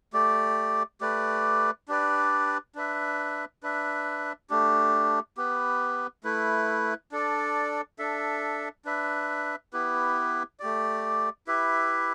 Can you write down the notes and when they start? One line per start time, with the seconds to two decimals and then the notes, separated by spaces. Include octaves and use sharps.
0.13 A3 G4 D5
1.01 A3 G4 B4 D5
1.88 D4 G4 B4 D5
2.75 D4 B4 E5
3.63 D4 B4 E5
4.50 A3 D4 G4
5.37 B3 G4 B4
6.24 A3 E4 B4
7.12 D4 A4 D5
7.99 D4 A4 E5
8.85 D4 B4 E5
9.73 B3 E4 G4 B4
10.60 A3 G4 D5
11.47 E4 G4 B4 E5